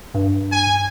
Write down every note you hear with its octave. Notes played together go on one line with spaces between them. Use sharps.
G2
G#5